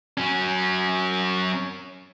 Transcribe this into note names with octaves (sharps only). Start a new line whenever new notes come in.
F#3 C#4